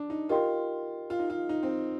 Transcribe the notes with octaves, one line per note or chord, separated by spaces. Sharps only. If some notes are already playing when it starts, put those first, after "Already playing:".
Already playing: D4
D#4
F4 G4 A#4 D#5 G5 C6
F4
D#4
F4
D#4
C4